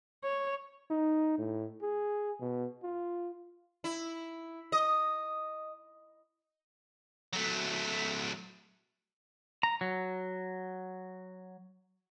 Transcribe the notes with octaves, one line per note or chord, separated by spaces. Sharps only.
C#5
D#4
A2
G#4
B2
F4
E4
D#5
F#3 A3
A#5
F#3